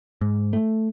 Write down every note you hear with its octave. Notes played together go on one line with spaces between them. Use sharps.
G#2
A3